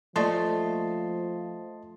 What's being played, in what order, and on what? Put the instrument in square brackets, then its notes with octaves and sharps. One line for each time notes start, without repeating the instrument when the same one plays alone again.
[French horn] F3 [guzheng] A3 [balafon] A#3 F4 D5 [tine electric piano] D#5 A5 C6